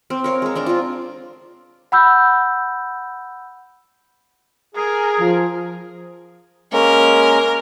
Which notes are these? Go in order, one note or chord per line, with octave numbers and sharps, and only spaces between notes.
C4
A#4 C#5 F5
G#3 A#4
C4 D4 A#4
D4 F4
F#5 B5 E6 G6
G#4 A#4
F3
G#3 A#3 C#4 A#4